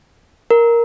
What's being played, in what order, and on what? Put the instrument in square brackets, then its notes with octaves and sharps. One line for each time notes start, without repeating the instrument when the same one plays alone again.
[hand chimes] A#4